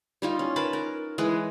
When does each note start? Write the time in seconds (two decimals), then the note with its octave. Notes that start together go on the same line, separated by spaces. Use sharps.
0.22 G3 D#4 F4
0.39 C#4
0.56 A#4 B4 A5 B5
0.73 A#4
1.18 E3 G#3 G#4 B4